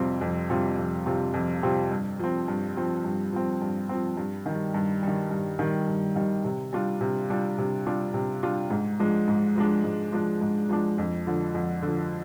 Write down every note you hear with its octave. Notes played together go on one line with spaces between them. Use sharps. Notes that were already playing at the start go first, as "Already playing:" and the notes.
Already playing: F2 C3 G3 C4 F4
F2
C3 G3 C4 F4
F2
C3 G3 C4 F4
F2
C3 G3 C4 F4
G2
F3 C4
G2
F3 C4
G2
F3 C4
G2
F3 C4
G2
D#3 G3
G2
D#3 G3
G2
D#3 G3
G2
D#3 G3
C3
G3 D4 F4
C3
G3 D4 F4
C3
G3 D4 F4
C3
G3 D4 F4
G#2
F3 G#3 D4
G#2
F3 G#3 D4
G#2
F3 G#3 D4
G#2
F3 G#3 D4
F2
D3 F3
F2
D3
F3